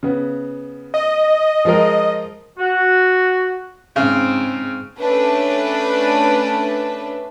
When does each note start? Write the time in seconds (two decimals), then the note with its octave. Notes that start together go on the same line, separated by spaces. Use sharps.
0.03 C#3 B3
0.94 D#5
1.65 F3 G#3 A#4
2.59 F#4
3.96 G#2 C#3 C4
4.99 A3 C#4 D4 B4